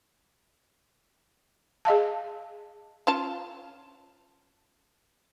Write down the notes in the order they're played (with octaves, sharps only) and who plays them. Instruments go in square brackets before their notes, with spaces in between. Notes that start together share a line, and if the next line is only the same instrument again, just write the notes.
[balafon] G#4 D#5 F5 A5
[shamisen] C#4 F4 A5